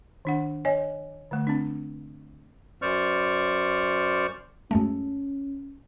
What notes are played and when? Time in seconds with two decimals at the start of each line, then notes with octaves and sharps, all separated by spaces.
0.25 D#3 D4 F#5
0.65 C#5 D#5 G#5
1.31 D3 A3
1.47 C4 D4
2.82 F#2 C5 D5 C#6 F6
4.71 F#2 G#3 A3 C#4